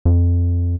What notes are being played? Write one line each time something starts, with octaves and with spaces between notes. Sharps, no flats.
F2